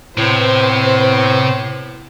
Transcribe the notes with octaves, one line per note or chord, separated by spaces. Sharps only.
A2 C3 B3 C5